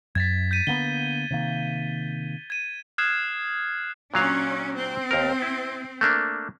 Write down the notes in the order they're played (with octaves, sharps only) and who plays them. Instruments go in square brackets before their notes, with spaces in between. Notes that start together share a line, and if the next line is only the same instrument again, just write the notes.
[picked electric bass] F#2 [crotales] G#6 A6 B6
[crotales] G6 B6 D#7
[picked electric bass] D3 A#3 B3 [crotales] G7
[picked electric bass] C3 D#3 A#3
[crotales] G#6 D#7
D#6 F6 F#6 G#6 C7 E7
[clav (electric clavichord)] A#2 F#3 F5 [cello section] C#4 D4
[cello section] C4
[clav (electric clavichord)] D#2 A#4
E4
A3 A#3 D4